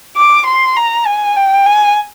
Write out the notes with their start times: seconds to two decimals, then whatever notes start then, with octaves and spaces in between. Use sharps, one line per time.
0.16 D6
0.47 C6
0.76 A#5
1.07 G#5
1.37 G5
1.66 G#5